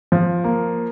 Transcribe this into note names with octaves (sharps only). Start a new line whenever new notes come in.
F3
A#3